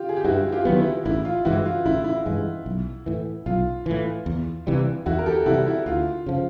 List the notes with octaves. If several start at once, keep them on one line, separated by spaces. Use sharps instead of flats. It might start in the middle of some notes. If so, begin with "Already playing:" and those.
Already playing: F4 G4
G#4
G4
G2 E4 F#4
F4 G4
D#3 F#3 B3
E4
A1 E4
F4
G2 E3 G#3 E4 F#4
F4
A1 E4
E4
G2 E3 G#3
B1
A2 E3
B1 F4
A2 E3
E2
C3 E3 G3
E2 E4 F#4
A#4
G4 A4
C3 E3 G3 E4 F#4
E4
D2 F4
C#3 F3